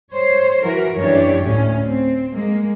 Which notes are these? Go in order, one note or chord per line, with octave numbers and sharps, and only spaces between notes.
C5 C#5
E3 F#4 A#4
F#2 E3 D4 G4 C#5
D2 A2 C#4
C4
G#3 A#3